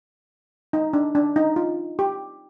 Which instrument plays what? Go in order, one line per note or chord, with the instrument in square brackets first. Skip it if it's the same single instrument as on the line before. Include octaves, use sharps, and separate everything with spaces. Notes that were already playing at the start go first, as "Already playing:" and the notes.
[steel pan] D#4
D4
D4
D#4
F4
G4